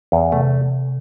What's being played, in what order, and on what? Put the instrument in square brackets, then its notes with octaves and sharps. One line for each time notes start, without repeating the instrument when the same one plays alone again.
[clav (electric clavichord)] E2
[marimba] C3 [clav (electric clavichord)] A3